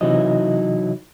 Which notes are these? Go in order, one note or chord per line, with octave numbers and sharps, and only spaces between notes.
C3 E3 F#3 D#4 E4 D#5